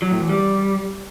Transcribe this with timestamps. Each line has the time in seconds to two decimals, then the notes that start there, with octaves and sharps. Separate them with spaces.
0.02 F#3
0.11 A2
0.20 E2
0.29 G3